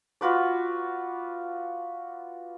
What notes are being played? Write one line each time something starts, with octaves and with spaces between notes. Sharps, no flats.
F4 F#4 B4 D5